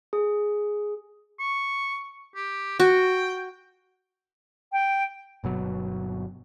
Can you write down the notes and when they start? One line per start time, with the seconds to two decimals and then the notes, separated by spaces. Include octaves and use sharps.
0.13 G#4
1.39 C#6
2.35 G4
2.80 F#4 G5
4.72 G5
5.44 G1 B2 F#3